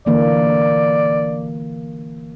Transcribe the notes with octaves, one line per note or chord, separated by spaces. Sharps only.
D3 E3 A#3 D5